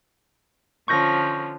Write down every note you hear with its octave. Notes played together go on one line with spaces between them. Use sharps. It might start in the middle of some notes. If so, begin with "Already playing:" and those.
D3 F3 C#4 C#6 G6 A#6